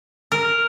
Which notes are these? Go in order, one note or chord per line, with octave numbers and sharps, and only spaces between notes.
A#4